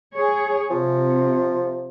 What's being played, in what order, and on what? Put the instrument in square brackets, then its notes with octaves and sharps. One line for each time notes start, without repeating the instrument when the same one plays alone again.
[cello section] G#4 C#5
[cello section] C3 [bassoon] F3